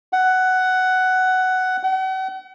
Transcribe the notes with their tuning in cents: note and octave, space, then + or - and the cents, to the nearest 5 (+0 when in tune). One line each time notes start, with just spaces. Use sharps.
F#5 +10
F#5 +40